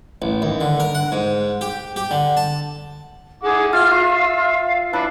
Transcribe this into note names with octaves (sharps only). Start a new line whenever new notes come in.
A1
D#2
D3
A#4
F#5
G#2
G4
G4
D3
A5
E4 G#4 F#5 D6
F4 E5 F6
F4 F5
D4 E4 B4